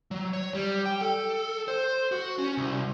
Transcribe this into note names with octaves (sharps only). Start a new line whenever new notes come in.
F#3
C#5
G3
G5
A4
C5
F#4
C#4
C2